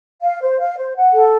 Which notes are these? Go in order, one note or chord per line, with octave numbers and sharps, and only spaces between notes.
F5
C5
F5
C5
F#5
A4